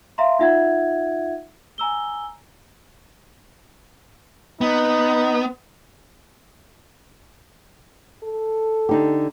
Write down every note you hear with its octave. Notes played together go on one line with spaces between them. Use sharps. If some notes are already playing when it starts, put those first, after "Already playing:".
E5 F5 A#5 C6
D#4 F4 E5 F#5 G#6
G#5 A#5 E6 G7
B3 D#4
A4
D3 D#4 G4